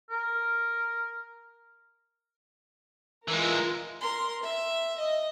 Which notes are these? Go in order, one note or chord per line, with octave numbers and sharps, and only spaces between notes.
A#4
E3 G#3 F4 A#4
A#4 C6
E5
D#5